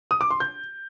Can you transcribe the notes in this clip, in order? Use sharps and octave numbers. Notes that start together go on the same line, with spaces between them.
D#6
D6
C6
G6